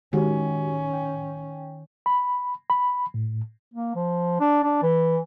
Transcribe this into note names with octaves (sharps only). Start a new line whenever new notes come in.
D#3 G#3 C#4 F#4 G4
G5
B5
B5
A2
A#3
F3
D4
D4
E3